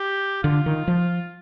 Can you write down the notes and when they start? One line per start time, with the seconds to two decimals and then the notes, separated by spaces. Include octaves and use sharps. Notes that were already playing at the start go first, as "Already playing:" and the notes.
Already playing: G4
0.43 D3 F4
0.66 D#3
0.88 F3